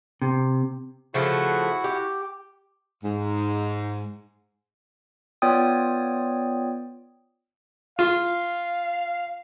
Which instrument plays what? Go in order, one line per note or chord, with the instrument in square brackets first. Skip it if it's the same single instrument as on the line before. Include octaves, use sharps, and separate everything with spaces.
[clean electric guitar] C3
[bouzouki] C#3 F3 A3 [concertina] E4 F#4 F#5
[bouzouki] G4
[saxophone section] G#2
[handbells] B3 F4 C#5 D5 G5 D#6
[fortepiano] F4 [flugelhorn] F5